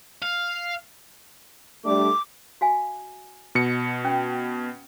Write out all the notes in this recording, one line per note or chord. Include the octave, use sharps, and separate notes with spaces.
F5
G3 A3 D4 D6
F#4 F5 G#5
B2 C#7
C#4 G5